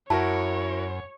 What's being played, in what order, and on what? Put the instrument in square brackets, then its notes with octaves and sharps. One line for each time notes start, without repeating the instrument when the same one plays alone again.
[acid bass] F#2 [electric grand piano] E4 F#4 A#4 [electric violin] C#5 [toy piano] A5